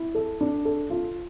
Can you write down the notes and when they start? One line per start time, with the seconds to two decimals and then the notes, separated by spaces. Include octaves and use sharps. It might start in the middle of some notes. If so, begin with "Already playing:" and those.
Already playing: E4
0.15 A4
0.41 D4
0.65 A4
0.90 F4